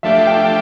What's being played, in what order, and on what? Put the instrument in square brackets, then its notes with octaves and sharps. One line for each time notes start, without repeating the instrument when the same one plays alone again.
[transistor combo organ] F3 A3 D4 G4 [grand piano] E5
[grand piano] G5